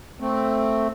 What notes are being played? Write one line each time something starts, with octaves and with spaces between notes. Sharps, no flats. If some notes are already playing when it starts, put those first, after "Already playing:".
A3 C4